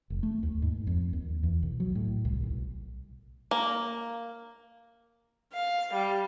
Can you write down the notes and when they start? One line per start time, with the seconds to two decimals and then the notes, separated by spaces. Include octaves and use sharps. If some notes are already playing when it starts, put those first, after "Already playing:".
0.10 F1
0.23 A3
0.43 D#2
0.62 G#2
0.87 F2
1.13 D#2
1.43 E2
1.63 B1
1.80 F#3
1.95 A2
2.25 C2
2.43 B1
3.51 A#3
5.53 F5
5.93 G3